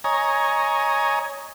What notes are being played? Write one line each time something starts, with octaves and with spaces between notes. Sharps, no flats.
C#5 D#5 G#5 A#5